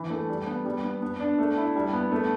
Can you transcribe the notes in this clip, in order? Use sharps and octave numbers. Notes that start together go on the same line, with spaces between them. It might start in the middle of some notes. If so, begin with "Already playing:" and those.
Already playing: E3
A3
G3
B3
G3
B3
B3
D4
A3
E4
G3
B3
A3